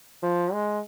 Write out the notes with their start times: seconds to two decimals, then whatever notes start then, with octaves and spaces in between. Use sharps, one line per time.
0.23 F3
0.53 G#3